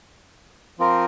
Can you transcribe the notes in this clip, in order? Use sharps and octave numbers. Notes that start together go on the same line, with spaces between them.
F3 C4 F4 A#4